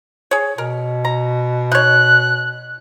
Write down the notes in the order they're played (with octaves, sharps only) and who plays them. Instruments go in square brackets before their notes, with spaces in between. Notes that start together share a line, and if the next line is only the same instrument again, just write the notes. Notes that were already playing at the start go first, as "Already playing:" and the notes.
[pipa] G#4 C#5
[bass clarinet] B2 [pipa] A#4
[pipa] A#5
[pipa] D#4 C#5 [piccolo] F#6